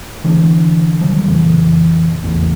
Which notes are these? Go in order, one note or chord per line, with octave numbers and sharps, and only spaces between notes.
D3 E3 G#3 D4
C3 D#3 F#3 G3
F2 A#2 C#3 E3
A1 E2 A2